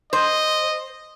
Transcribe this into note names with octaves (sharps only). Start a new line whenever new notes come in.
C5 D#5